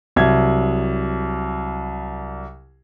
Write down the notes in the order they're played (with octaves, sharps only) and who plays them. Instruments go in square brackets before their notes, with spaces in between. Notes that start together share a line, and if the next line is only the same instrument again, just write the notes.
[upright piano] C2 F#3 G#6